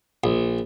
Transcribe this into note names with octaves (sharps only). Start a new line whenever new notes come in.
A#1